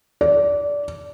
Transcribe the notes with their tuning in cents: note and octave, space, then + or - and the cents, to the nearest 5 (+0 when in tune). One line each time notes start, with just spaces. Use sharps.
D5 -20